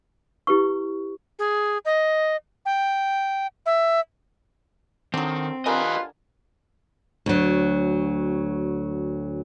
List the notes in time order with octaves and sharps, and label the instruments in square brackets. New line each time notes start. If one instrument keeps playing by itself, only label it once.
[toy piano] E4 G4 B4 C#6
[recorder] G#4
D#5
G5
E5
[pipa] D3 F#3 [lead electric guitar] D#3 [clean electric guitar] C4
[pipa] D3 A#4 G#5 [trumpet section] F4 B4 [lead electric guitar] G4 D#5
[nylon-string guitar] D2 F#3